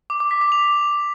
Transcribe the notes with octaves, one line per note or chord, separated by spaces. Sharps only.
D6
D6
B6
D6
F7